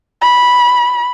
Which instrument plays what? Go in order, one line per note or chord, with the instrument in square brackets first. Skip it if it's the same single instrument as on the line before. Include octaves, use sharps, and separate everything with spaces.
[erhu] B5